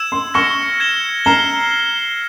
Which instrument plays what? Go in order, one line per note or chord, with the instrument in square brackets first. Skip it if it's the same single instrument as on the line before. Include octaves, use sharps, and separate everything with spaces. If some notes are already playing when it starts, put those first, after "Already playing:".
Already playing: [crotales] E6 G#6 E7
[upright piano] C6
[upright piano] C#6 [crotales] F6 A#6 C#7 E7 G7
[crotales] G#6 C#7 E7 G7
[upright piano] A#5 [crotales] F6 C7 E7 G7